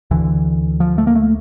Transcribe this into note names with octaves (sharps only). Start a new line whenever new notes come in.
D2 D3 E3
F3
A3
A#3
A3